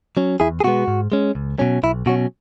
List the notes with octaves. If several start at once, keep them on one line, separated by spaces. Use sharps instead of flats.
F#3 C#4
E2 E4 G#4
G#4
B2 G#3 B3 F#4
G#2
G#3 C#4
C#2
B2 F#3 C#4
B1 E4
B2 F#3 C#4 F#4